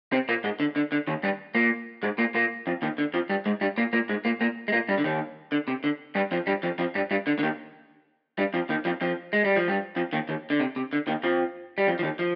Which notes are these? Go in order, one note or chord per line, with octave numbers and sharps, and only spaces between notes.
C3 C4
A#2 A#3
G#2 G#3
D3
D3
D3
D#2 D#3
G2 G3
A#2 A#3
G#2 G#3
A#2 A#3
A#2 A#3
F2 F3
D#2 D#3
D3
F2 F3
G2 G3
G#2 G#3
G2 G3
A#2 A#3
A#2 A#3
G#2 G#3
A#2 A#3
A#2 A#3
G#3
A#2 A#3
G2 G3
D3
D#2 D#3
D3
C3
D3
G2 G3
F2 F3
G2 G3
F2 F3
F2 F3
G2 G3
G2 G3
D3
D3
D#2 D#3
G2 G3
F2 F3
D#2 D#3
F2 F3
F2 F3
G#3
G3
F3
G2 G3
F2 F3
D#2 D#3
D#2 D#3
D3
C3
C3
D3
D#2 D#3
F2 F3
G3
F2 F3
F3
D#2 D#3
F3